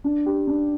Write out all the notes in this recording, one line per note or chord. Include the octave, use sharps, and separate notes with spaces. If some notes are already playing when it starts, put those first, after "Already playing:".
D4
G4
D4